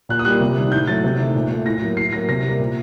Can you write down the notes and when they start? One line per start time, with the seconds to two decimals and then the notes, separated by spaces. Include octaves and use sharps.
0.09 A#2 F#6
0.19 D#6
0.25 G3 A#3 F#6
0.40 C3
0.56 D#3 G3
0.72 A2 G6
0.87 F#3 A3 A6
1.04 C3
1.19 D#3 A3
1.35 A#2
1.50 A3
1.65 A2 A#6
1.82 F#3 A#3
1.97 A2 C7
2.12 F#3 A#6
2.17 A#3
2.29 C3 A#6
2.44 G3 A#3
2.59 A#2